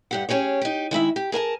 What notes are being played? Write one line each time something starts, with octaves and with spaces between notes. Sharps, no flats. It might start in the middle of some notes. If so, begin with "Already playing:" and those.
G2 G4 F#5
C#4 G4 G#4 C#5
D#4 G4
D#3 G#3 E4 E5
G4
G#4 A#4 G#5 A5